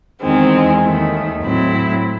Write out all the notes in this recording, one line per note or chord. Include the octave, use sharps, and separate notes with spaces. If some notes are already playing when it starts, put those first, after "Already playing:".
E2 D#3 G#3 C4
D#2 D#3 A3
A2 F#3 C4 E4